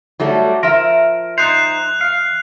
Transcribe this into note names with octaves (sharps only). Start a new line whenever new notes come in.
F#3 G3 A3
F3 A#4 E5
D#4 C5 F#6 F7
F5